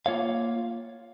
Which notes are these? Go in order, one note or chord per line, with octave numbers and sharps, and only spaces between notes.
A#3 F4 C#5 F5